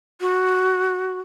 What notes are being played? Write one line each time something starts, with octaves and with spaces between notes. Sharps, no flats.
F#4